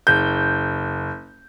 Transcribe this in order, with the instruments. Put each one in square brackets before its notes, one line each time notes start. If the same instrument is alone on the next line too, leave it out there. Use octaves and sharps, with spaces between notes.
[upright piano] F#1 G6